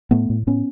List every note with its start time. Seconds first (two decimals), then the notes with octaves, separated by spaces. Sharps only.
0.11 A2 A3 B3
0.30 A2
0.47 A2 B3 C#4